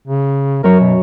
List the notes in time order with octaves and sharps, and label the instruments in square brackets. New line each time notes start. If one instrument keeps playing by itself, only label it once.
[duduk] C#3
[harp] F#2 F#3 C#5 [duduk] A#4
[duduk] B2